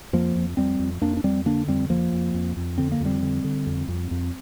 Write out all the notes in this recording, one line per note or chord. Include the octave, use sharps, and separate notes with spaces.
F2 F3 A#3
F2
F2 G3 C4
F2
F2 A#3 D4
D4
F2 G3 C4
D3 A#3 D4
F2 G3 C4
F2 F3 A#3
F2
F2
F2
D3 C4
A#3
F2
G3 C4
D3
D3
F2
F2
F2